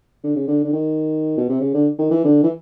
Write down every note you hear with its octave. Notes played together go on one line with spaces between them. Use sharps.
D3
C#3
D3
D3
D#3
B2
C3
C#3
D3
D#3
E3
D3
E3